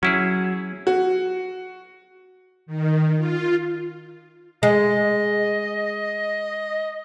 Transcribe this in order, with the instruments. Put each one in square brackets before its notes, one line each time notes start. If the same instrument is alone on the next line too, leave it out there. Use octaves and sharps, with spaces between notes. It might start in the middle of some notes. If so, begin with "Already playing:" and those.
[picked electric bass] F#3 [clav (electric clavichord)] C#4 E4 G#4
[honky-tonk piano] F#4
[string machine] D#3
F4
[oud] G#3 [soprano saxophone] D#5